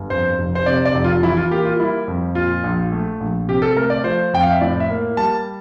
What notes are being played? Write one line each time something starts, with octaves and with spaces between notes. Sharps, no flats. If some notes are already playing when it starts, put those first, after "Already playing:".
Already playing: G1
F2 C5
F1
C5
C3 D5
D5
F1
F4
E3 E4
F4
A#3 G4
F4
G3 E4
F2
A#2 F4
A#1
A3
A#1
C3 G4
A4
A3 A#4
D5
F3 C5
F2 G5
F5
E5
A2 D5
E5
A#3
G3 A5